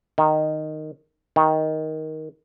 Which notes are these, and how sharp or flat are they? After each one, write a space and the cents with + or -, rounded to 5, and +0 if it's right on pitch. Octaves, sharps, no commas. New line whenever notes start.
D#3 -10
D#3 +10